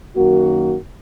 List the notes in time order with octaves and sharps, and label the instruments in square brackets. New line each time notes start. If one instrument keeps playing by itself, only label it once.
[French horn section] F#2 D#3 A#3 F#4